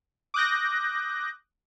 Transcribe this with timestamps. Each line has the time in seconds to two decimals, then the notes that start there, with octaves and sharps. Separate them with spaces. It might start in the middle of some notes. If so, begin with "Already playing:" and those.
0.34 D6 D#6 F#6 G6 A#6